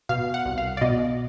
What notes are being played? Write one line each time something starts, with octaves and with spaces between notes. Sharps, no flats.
B2 F5
F#5
C2
F5
D5
B2 D#5